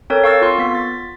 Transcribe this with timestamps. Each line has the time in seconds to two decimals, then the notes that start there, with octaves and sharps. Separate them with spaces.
0.10 C4 A4 A#4 C#5
0.24 F5 C#6 E6 A6
0.42 F4 C6
0.58 B3 B6
0.75 A6